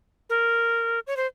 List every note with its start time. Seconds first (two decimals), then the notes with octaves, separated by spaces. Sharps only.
0.30 A#4
1.07 C#5
1.17 C5